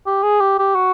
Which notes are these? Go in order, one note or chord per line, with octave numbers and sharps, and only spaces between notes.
G4
G#4
G4
G4
F#4